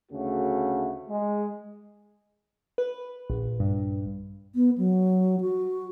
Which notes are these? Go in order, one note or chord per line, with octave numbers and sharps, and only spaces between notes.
D2 C#3 A3 F#4
G#3
B4
A#1
G2
B3
F#3
F#4